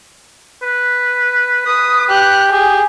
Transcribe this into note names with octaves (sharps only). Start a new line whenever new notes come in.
B4
B4 D#6
G4 F#6
G4 G#4